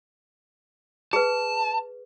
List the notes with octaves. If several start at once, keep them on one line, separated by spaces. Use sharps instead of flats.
G#4 B4 A5